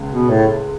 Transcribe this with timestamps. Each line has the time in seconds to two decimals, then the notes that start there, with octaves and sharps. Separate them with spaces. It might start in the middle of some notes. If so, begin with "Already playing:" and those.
Already playing: C#2 C#3 G#3
0.11 B2
0.29 A2